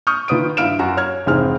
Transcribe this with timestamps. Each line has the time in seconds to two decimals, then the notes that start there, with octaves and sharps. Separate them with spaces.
0.07 C#6 D#6 F6 G6
0.28 D#3 F4 B4 D#6 D7
0.57 G2 E4 F5 F6 D7 E7
0.79 F#2 F#4
0.97 C#5 F6 G#6
1.26 F1 G#2 E3 C4 G#4 F6